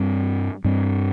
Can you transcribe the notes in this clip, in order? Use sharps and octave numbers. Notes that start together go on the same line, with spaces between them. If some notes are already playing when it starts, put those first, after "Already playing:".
Already playing: G2 G3 C4
G2 G3 C4